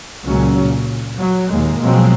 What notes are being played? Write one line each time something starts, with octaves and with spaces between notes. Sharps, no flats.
C#2 A#2 F#3 C#4
A#2
F#3
D#2 A#2 G#3 A#3
B2 F3 F#3 G#3 C4